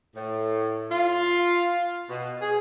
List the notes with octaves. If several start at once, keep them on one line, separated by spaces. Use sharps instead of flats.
A2
F4
B2
G#4